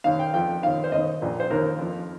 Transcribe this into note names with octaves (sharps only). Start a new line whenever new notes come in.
D#2 D#3 F5
G5
F2 F3 G5
D#2 D#3 F5
C5
D#2 D#3 D#5
A#1 A#2 F3
C5
D#2 D#3 A#4
F2 F3